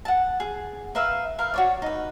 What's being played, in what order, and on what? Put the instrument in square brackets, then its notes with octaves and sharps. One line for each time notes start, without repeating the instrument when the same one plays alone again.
[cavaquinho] F#5 A5
G#4
A#4 B4 E5 F5
A#4 B4 F5
F#4 C#5 D5
D#4 B4